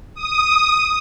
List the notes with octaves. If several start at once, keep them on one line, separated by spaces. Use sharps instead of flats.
D#6